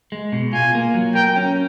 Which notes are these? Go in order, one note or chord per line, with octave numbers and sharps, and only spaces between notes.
G#3
B2
F4 G#5
A#3
F#3
A#4 G5
C#4